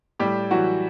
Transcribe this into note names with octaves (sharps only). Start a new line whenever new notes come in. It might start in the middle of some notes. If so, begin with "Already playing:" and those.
A2 G3 G4
E3 F#3 F#4